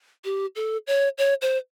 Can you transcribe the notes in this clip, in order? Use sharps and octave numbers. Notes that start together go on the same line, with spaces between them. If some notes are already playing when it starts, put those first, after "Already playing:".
G4
A4
C#5
C#5
C5